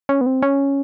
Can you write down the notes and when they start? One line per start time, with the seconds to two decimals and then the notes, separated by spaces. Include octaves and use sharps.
0.09 C#4
0.21 B3
0.26 C4
0.43 C#4